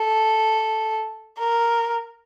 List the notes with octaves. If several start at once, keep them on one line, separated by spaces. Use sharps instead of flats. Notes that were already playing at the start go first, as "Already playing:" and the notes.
Already playing: A4
A#4